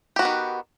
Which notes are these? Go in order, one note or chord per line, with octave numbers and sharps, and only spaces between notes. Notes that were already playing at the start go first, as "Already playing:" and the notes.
D#3 B3 F#4 G4